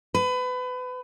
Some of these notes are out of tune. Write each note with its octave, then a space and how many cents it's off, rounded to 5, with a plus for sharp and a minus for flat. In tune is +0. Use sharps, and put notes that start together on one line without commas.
B4 +30